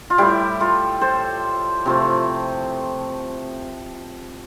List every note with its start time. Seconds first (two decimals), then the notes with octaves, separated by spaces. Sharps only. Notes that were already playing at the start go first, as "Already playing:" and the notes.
0.10 F4
0.18 A2 G3 E4 G4
0.60 F4 A4
1.01 A4 C5
1.86 C3 F3 A3